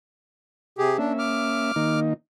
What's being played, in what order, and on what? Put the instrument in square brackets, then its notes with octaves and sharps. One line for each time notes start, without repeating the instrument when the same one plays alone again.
[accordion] C3 G4 G#4
[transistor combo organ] A#3 C#4 E5 [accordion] D4
[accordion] D6 F6
[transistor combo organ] D#3 A#3 D#4